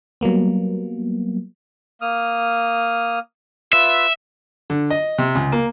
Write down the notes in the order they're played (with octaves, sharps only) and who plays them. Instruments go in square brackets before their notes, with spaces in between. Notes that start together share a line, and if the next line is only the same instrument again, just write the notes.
[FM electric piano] F#3 G3 A#3 B3
[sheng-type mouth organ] A#3 D#6 F6
[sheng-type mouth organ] F4 B4 E6 [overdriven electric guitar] E5
[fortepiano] D3
D#5
C3
C#2
A#3